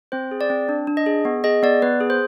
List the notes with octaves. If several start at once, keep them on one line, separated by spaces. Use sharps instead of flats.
C4 C5
G#4
D5
C4
D4
D4
D#5
G#4
B3
G#4 D#5
B3 D5
B3 B4
G#4
C5